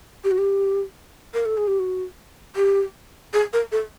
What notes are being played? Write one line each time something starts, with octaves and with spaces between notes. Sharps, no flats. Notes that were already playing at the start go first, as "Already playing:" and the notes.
G4
F#4
G4
A#4
A4
G#4
G4
F#4
G4
G#4
A#4
A4